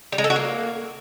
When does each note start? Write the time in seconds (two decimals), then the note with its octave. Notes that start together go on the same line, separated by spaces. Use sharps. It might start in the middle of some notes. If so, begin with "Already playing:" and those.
0.12 G3
0.18 G#3
0.24 A4
0.30 F#4
0.36 A#3